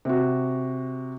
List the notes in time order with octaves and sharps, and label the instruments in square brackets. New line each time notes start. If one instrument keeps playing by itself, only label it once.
[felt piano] C3 F#4